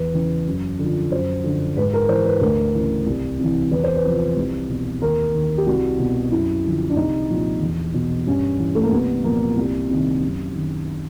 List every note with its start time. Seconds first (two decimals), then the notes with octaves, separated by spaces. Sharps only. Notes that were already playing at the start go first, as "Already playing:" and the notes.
Already playing: E2 B4
0.14 C#3 E3
0.47 F#2
0.79 D3 F3
1.12 F#2 C5
1.44 D3 F3
1.77 G#2 B4
1.93 A#4
2.09 E3 C5
2.25 B4
2.41 D2 A#4
2.74 C#3 E3
3.07 C2
3.39 C3 E3
3.71 E2 B4
3.84 C5
3.96 B4
4.04 C3 F3
4.37 C2
4.69 B2
5.02 D#2 A#4
5.34 D#3
5.58 G4
5.66 C2 F#4
5.99 B2
6.31 F#2 E4
6.64 D3 F3
6.89 D4
6.96 C2 D#4
7.29 A#2 F3
7.61 E2
7.94 B2
8.27 G2 C#4
8.59 E3
8.75 A3
8.83 A#3
8.92 C2 B3
9.24 A#2 F3 A#3
9.57 C2
9.90 C3 D#3
10.21 F#2
10.55 D#3